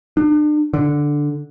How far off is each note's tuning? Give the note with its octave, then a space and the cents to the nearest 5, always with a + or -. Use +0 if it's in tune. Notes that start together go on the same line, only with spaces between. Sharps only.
D4 +40
D3 +0